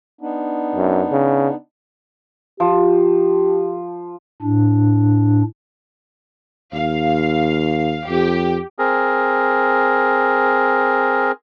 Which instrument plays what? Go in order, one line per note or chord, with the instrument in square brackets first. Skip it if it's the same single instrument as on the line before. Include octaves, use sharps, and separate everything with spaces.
[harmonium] B3 D4 D#4
[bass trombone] F#2
C#3
[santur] F3 [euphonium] G4
[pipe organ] A2 D4
[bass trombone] D#2 [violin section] F5
[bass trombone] F2 [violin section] G4
[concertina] C4 G#4 A#4